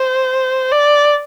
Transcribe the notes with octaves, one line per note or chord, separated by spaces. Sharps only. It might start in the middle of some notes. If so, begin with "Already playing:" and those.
Already playing: C5
D5